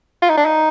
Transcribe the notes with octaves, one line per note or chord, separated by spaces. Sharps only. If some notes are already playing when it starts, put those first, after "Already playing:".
F4
D#4
D4
D#4